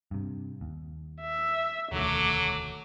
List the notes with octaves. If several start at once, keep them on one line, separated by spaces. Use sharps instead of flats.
G2 C3
D#2
E5
E1 D2 D#3 F#3 A3 D6